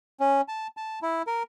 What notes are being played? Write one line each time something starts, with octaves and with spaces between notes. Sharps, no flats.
C#4
A5
A5
E4
A#4